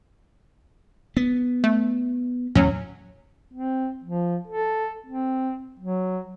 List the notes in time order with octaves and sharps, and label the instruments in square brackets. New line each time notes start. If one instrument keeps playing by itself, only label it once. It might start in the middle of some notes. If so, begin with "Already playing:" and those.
[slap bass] B3
[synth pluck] A3
[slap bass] D#2 A2 [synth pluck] F#3 C#4
[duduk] C4
F3
A4
C4
F#3